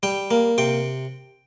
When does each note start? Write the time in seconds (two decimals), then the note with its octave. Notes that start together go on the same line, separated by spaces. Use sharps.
0.03 G3 G5
0.31 A#3
0.58 C3 G5